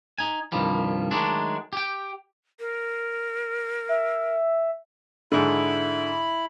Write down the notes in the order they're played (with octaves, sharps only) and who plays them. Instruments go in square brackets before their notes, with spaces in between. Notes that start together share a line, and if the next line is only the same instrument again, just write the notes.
[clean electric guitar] D#4 G#5
C2 G2 D#3 F3 G3
D#3 F#3 G#3 A3 D4
G4 G5
[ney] A#4
[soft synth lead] E5
[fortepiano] G#2 D3 [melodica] E4 B5